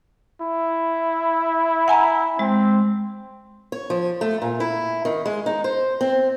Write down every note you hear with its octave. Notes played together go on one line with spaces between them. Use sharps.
E4
F#5 G#5 A#5
G#3 C4
C#5
F3
A3
A#2
E4
D#3
G#3
D#4
C5
C4